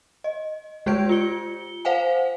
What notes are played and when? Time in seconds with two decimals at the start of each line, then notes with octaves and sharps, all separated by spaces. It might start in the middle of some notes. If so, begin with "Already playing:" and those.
0.24 D#5
0.86 G#3 G4 C5 G6 G#6 D7
1.09 F4 C#7 G7
1.85 C5 F5 F#5 G#5